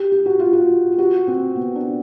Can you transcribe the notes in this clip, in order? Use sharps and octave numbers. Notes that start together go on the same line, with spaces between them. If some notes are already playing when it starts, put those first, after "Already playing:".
Already playing: G4
G4
F#4
F4
F#4
G4
F#4
C4
B3
D4